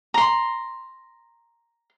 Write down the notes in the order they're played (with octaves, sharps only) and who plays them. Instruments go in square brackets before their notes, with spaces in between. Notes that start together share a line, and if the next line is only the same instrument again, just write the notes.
[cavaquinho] A#5 C6